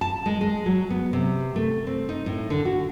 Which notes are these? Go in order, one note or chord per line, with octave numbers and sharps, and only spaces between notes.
A5
G#3
G#3
F#3
B3
C3
A3
C4
D#4
A2
D3
F#4